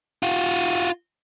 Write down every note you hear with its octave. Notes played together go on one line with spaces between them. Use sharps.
F4 F#4